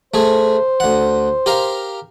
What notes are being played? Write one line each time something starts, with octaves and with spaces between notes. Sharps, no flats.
A3 G#4 C5
D2 F#5
G4 A#4 F5